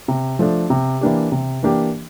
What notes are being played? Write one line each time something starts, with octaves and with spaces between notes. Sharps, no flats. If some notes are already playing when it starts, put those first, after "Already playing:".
C3
F3 A3 D4
C3
E3 A#3 D4 G4
C3
E3 A#3 D4 G4